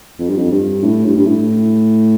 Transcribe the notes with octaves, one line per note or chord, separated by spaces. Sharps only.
F2
G2
F2
G2
A2
G2
G2
A2